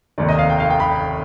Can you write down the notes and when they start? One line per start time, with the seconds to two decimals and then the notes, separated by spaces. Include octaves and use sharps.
0.18 F1 D#2 D#3 D5
0.29 D#5
0.39 F5
0.50 G5
0.60 F5
0.70 G5
0.80 B5